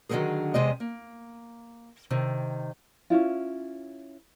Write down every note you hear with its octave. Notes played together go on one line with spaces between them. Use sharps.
D3 D#3 F3 F#3 A#3 G#4
E2 C3 G#3 D#5
A#3
C3 D#3
C#4 D4 E4 F4